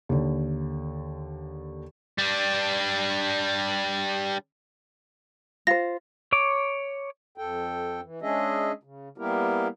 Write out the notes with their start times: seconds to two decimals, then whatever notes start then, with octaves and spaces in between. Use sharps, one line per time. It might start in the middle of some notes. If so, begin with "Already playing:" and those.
0.09 D#2 D3
2.18 G3 D4
5.67 F4 C5 A#6
6.33 C#5 D6
7.38 F2 A4 G5
8.03 E3
8.22 G#3 C#4 D4 G#4 D#5 E5
8.83 C#3
9.18 G3 A#3 B3 E4 G4 A#4